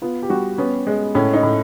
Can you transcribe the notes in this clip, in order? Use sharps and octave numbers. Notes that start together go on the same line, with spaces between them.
B3 F4
G4
G3 F#4
B3 C#4
G#3
A2 C#4
D#4
A2